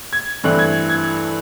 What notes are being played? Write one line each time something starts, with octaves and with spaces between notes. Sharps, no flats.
G#6
G2 E3 A3 C4 E4 F#6
G#6
G#6